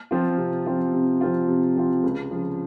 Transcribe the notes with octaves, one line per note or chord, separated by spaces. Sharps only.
F3 C4 F4
C3
F3 C4 F4
C3
F3 C4 F4
C3
F3 C4 F4
C#2
C#3 F3